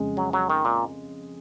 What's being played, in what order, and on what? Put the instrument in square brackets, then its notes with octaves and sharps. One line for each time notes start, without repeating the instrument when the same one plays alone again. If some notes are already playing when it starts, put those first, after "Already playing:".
Already playing: [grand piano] F2 C#3 G#3
[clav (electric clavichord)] F#3
F#3
D#3
A#2